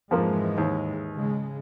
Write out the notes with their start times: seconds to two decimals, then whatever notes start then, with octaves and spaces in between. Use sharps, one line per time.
0.11 F2 G#2 E3 F3 G#3 A#3
0.58 D#2
1.12 C#3 G#3